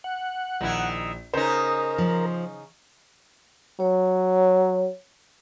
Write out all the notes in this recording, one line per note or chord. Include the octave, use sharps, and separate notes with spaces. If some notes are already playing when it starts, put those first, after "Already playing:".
F#5
A#1 D#3 E4
C#3 D#4 A#4 C5
F3
F#3 C#5